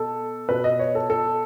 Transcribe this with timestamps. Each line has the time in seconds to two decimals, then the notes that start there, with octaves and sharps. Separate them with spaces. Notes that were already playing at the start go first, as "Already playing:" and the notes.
Already playing: B2 A4
0.49 B2 B4
0.64 D#5
0.79 C#5
0.95 A4
1.10 A4